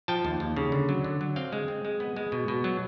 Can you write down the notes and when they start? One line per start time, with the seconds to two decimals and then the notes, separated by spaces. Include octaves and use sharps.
0.08 F3 G5 A5
0.25 D#2
0.40 D#2
0.56 C#3
0.72 D3
0.89 F#3
1.04 D3
1.21 F#3
1.36 C4 F5 G5
1.52 G#3
1.68 C4
1.85 G#3
2.00 B3
2.16 G#3
2.32 B2
2.48 B2
2.64 F#3